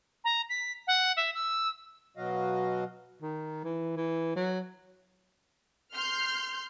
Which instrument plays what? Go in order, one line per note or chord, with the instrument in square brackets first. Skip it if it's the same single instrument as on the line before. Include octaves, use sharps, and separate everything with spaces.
[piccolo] A#5
B6
F#5
E5
E6
[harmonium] B2 F#3 F#4 D#5 F5
[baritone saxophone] D#3
E3
E3
F#3
[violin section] C6 F6 G6 C7